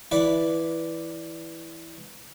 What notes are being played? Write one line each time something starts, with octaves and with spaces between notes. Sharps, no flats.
E3 B4 D5